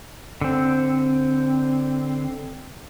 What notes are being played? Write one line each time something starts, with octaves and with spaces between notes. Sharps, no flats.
D3 C4